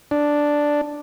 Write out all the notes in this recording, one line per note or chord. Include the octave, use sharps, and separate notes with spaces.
D4